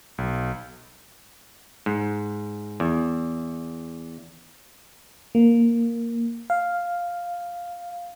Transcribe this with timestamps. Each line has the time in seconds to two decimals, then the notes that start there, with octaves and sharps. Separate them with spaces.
0.18 B1
1.86 G#2
2.80 E2
5.35 A#3
6.50 F5